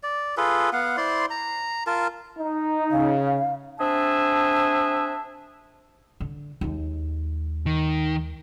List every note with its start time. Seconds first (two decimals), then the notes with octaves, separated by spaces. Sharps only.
0.03 D5
0.37 F4 G#4 A4 B4
0.73 B3 F5 F#5
0.97 E4 C5 D5 C6
1.30 A#5
1.87 F4 A#4 A5
2.38 D#4
2.91 C#3 F5
3.79 C4 D4 G#4 E5 A5
6.20 D3
6.61 D#2 G#3
7.66 D#3